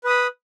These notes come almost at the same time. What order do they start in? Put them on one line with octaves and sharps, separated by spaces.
B4 D#6 B5